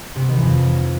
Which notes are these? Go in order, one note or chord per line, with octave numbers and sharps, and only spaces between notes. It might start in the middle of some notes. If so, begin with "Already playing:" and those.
C3
B3
D#3
E3
F2